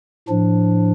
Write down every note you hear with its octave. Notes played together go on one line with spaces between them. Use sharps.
A2 F3 D4